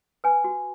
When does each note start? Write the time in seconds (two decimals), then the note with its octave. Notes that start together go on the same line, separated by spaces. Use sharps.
0.24 B4 G#5
0.44 F#4